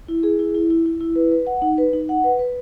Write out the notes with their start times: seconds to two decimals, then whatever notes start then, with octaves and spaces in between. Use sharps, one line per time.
0.08 E4
0.23 G#4
0.39 E4
0.54 E4
0.70 E4
0.86 E4
1.01 E4
1.16 B4
1.32 B4
1.47 F#5
1.62 D#4
1.78 B4
1.93 D#4
2.09 F#5
2.24 B4
2.39 B4